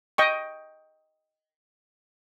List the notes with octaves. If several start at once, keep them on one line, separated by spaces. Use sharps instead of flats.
D#5 G5 C#6